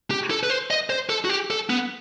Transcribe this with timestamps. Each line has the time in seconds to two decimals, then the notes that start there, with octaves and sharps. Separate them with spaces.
0.11 G4
0.31 A4
0.43 B4
0.50 C5
0.70 D#5
0.90 C5
1.10 A4
1.25 F#4
1.29 G4
1.50 A4
1.70 B3